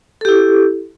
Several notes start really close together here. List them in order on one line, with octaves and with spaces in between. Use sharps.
A4 G4 E4